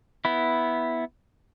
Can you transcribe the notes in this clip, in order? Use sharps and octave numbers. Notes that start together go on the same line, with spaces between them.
B3 E4